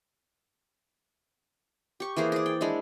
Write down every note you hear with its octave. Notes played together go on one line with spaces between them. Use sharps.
G4 C#6
E3 A#3 G#4 C5
G#4 D5
G5
G#3 D4 E4